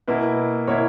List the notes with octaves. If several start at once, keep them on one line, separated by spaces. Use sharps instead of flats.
B2 A#3 E4 B4
B2 A#3 E4 C#5